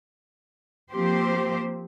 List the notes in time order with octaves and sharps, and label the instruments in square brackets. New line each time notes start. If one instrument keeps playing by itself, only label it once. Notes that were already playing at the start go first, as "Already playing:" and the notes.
[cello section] F3 A#3 C4 G4 C5